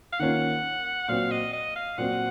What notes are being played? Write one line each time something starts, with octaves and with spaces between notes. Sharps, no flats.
F5
D#3 A#3 C#4 F4 F#5
A#2 F#3 C4 F#4 F5
D#5
D#5
F5
A#2 F#3 C4 F#4 F#5